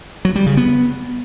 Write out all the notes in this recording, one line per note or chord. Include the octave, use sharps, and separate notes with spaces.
F#3
G3
C#3
B3